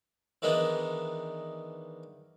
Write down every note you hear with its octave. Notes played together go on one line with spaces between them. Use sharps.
D#3 E3 G#3 B3 D4 D#4